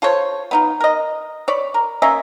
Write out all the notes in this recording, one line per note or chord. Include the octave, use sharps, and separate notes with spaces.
F4 A4 C5 C#5
B3 D#4 F4
A#4 D#5
C#5 D5 B5
A#4
A#3 C#4 D#5 E5